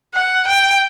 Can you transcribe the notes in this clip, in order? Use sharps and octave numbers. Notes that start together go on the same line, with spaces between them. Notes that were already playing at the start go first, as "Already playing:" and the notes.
F#5
G5